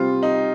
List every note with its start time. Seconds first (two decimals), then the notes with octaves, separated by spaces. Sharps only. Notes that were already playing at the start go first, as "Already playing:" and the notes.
Already playing: C3 G3 C4 F4 G4
0.23 D#4